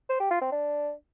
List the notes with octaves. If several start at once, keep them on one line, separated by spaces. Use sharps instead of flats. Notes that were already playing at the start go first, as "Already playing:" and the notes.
C5
G4
F4
C4
D4